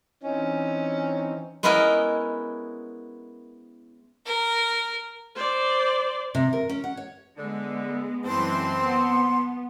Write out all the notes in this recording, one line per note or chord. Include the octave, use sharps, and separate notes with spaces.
E3 C4 C#4 D#4
G#3 B3 C#4 E4 A#4 D#5
A#4
C5 D5
C3
A#4
C#4
F#5
C#5
D3 G#3 B3
F#2 E3 G#3 C4 A5 C6
B3